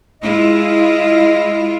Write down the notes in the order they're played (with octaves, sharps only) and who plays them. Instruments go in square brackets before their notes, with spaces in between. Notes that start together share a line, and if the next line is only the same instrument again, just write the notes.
[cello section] G#3 E4 F4 [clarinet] D#5